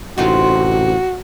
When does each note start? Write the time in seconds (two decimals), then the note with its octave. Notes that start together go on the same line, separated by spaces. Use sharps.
0.18 A1 C3 D#4 F4 F#4